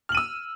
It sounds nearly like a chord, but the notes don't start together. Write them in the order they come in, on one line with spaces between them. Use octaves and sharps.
F6 F#7 D#7 E6